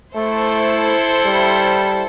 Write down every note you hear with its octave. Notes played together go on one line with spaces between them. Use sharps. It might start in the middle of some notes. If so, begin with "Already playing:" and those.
A3 E4 A4 C5
G3